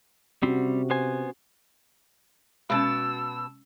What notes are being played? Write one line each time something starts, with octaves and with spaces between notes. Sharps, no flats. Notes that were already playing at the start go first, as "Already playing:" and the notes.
C3 G3 C4 C#4 F#4
B3 C5 G#5
B2 G#3 C#4 A5 E6